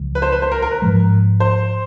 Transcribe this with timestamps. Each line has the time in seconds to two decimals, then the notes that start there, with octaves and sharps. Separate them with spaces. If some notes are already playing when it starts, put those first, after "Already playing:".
Already playing: C#2 C#3 F3
0.15 B4
0.22 C5
0.32 B4
0.42 C5
0.52 A#4
0.62 A#4
0.71 B4
0.82 G#2 F3 G#3
1.40 C5